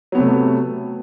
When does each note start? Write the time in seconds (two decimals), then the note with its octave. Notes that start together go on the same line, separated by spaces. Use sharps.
0.12 F#3
0.15 B3
0.17 C3
0.20 A3